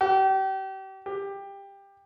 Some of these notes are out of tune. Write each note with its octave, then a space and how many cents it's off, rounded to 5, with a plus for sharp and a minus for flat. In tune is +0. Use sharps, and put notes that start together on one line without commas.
G4 -35
G4 +15